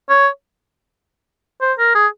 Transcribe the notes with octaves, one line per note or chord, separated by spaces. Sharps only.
C#5
C5
A#4
G#4